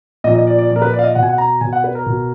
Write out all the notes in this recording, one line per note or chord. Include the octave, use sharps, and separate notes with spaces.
A#2 F3 D#5
D#5
D5
D5
A#2 F3 D5
A#4
B4
D5
F5
D#5
B2 F#5
G#5
F#5
A#5
B2 G#5
F#5
B4
A#4
B2